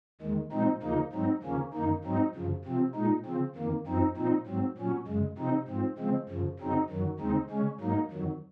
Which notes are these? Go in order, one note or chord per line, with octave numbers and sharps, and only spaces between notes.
D#2 D#3 G#3
A#2 F3 G#3 C4 D#4
D#2 C#3 F3 A#3 D#4
G#2 F#3 C4 D#4
D#2 C#3 F3 A#3 C#4
F#2 D#3 A#3 D#4
G#2 F#3 C4 D#4
F#2 C#3 F3
C3 F3 C4
A#2 G#3 D#4
C#3 F3 C4
F2 D#3 A#3
F#2 F3 C4 D#4
A#2 F3 C4 D#4
G#2 F#3 C4
A#2 F#3 C#4
F#2 C#3 G#3
C3 F3 C4 D#4
G#2 F3 C4
C#3 F3 G#3 C4
F#2 C#3 F3
F#2 C#3 F#3 C4 D#4
F#2 D#3 F#3
D#2 C#3 G#3 C4 D#4
C#3 G#3 C#4
G#2 F#3 A#3 D#4
F2 D#3 F#3